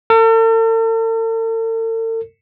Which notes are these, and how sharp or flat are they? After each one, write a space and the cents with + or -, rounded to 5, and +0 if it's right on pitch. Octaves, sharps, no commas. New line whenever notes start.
A4 +45